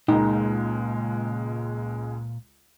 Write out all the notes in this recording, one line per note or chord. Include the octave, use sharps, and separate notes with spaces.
C#2 A#2 G#3 D#4